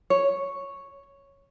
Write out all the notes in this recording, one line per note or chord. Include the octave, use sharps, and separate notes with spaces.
C#5